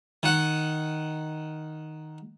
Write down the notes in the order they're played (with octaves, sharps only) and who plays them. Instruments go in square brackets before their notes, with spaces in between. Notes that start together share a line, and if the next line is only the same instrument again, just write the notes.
[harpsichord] D#3 F#5